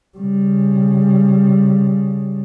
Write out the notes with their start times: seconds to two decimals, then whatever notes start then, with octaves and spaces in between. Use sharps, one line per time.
0.18 C#3 G3